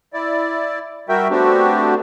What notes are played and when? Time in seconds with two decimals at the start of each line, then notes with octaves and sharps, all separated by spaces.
0.13 E4 D5
1.09 G3 F#4 A#4 E5 G5
1.31 A3 B3 C4 D4 F#4 G4